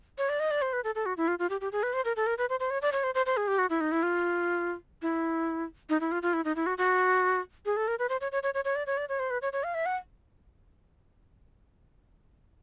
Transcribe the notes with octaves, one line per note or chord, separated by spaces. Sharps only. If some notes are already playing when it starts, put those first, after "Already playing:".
C#5
D5
D#5
D5
C5
B4
A4
A4
F#4
E4
F4
F4
G4
G4
G#4
B4
C5
A#4
A4
A#4
B4
C5
C5
C#5
D5
C#5
C5
C5
C5
G#4
G4
F#4
E4
D#4
E4
F4
E4
D#4
E4
F4
F4
E4
D#4
E4
F#4
F#4
G#4
A4
A#4
B4
C5
C#5
C#5
C#5
C#5
C#5
D5
C#5
D5
C#5
C5
B4
C#5
C#5
F5
E5
F#5